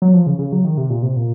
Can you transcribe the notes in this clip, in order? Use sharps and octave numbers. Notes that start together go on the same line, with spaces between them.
F#3
F3
C#3
C#3
F#3
D#3
C3
A#2
C3
A#2